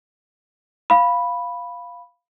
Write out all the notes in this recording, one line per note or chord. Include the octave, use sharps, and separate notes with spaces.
F5 B5